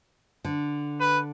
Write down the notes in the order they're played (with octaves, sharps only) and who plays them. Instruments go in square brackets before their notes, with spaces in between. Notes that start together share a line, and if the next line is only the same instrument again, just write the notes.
[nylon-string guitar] D3
[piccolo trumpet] B4